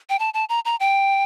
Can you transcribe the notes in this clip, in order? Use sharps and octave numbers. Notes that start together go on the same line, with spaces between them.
G5
A5
A5
A#5
A#5
G5